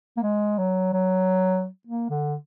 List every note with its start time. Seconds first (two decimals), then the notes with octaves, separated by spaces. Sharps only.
0.17 A#3
0.23 G#3
0.59 F#3
0.93 F#3
1.87 A#3
2.10 D3